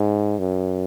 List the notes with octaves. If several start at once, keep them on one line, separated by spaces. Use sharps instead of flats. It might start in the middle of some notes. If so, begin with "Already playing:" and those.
Already playing: G#2
F#2